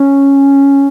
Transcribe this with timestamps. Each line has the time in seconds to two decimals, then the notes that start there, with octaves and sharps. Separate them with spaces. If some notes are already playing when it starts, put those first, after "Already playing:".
Already playing: C#4